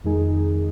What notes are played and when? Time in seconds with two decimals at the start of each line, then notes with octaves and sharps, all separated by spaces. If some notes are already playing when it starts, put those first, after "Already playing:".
0.04 F2 D#3 G#3 D#4 G#4